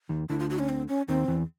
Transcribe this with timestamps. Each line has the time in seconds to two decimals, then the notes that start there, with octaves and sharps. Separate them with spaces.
0.09 D#2 D#3
0.30 D2 D3 E4
0.39 F4
0.50 F#4
0.59 C#4
0.69 C4
0.88 C#4
1.08 D#2 D#3 C4
1.28 E2 E3